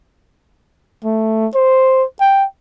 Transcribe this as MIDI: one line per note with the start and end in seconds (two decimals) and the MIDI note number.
1.04 1.47 57
1.55 2.05 72
2.21 2.45 79